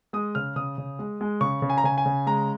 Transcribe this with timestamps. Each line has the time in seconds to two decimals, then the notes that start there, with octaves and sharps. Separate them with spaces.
0.13 G#3 D#6
0.35 C#3 F6
0.56 C#3 D#6
0.78 C#3
0.99 G#3
1.21 G#3
1.41 C#3 C#6
1.62 C#3
1.70 G#5
1.78 A#5
1.84 C#3 G#5
1.98 G#5
2.06 C#3
2.27 G#3 A#5